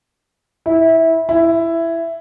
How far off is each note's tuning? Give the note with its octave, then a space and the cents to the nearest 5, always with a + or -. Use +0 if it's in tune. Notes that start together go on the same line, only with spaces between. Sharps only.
E4 -15
E4 +10